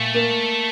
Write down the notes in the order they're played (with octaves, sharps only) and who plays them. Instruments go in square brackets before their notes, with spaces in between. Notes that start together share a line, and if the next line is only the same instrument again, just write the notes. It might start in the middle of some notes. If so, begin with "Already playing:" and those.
Already playing: [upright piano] A#2 [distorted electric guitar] A3
[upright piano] A#3